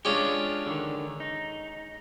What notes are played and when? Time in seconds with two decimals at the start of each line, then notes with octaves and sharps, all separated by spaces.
0.05 G#3 C#4 D4 F4 G4
0.66 D3 D#3
1.20 D#4